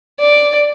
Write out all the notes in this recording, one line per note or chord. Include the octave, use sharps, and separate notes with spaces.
D5